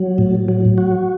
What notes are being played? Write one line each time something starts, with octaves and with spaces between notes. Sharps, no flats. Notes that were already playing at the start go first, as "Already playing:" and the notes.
Already playing: F#3
A2
F#3
F#4